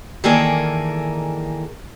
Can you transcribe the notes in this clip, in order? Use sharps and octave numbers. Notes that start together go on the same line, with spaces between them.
D#3 E3 A#3 G#4 A4 D5